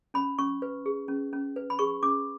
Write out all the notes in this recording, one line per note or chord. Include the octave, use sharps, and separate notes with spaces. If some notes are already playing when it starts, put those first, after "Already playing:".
C#4 B5
C#4 C#6
B4
G#4
C#4
C#4
B4
B5
G#4 C#6
C#4 D6